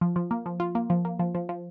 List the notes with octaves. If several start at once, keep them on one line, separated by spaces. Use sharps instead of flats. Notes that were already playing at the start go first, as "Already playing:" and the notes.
F3
F3
A#3
F3
F4
A#3
F3
A#3
F3
F3
F3